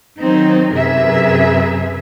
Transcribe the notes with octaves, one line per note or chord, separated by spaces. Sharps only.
D#3 F#3 C4 D#4
F#2 C3 G#4 A#4 B4 E5